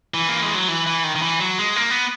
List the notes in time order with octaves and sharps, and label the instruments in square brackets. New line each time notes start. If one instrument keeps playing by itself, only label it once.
[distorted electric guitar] E3
A#3
G#3
F#3
E3
E3
D#3
D#3
E3
F#3
G#3
A#3
B3